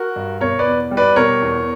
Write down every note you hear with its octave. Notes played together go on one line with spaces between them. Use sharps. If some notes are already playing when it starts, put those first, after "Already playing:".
Already playing: F#4 A#4
G2
B2 A#4 C#5
B4 D5
E2
G3
B4 D5
B2 A#4 C#5
E2